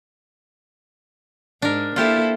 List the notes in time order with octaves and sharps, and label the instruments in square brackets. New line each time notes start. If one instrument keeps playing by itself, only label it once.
[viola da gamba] G#2 [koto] D4 A#4
[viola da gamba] A#3 E4 A4 [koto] F4 G4 C5